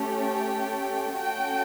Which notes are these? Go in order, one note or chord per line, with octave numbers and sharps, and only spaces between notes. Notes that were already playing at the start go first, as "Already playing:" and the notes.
Already playing: A3 C#4 G4
G5
A3 C#4 F#4 A4 G5